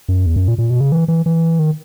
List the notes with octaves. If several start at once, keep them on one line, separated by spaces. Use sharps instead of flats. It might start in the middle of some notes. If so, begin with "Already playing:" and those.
F#2
E2
F#2
A#2
A#2
B2
C#3
E3
E3
E3
D#3